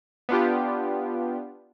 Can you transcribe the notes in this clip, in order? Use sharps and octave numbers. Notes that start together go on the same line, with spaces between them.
B3 D4 F4 G4